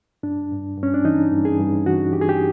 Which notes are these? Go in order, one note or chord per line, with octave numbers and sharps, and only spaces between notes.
G2 D4
G2
G2
C#4
D4
E3 D#4
G2
G#4
G2
E3 F#4
E3 G4
G#4
G4